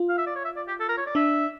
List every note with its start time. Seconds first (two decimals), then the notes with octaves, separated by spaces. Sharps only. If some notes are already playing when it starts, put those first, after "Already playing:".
Already playing: F4
0.09 F5
0.18 E5
0.27 D5
0.36 C#5
0.45 E5
0.56 D5
0.68 G4
0.80 A4
0.89 A#4
0.98 C#5
1.07 D5
1.15 D4 E5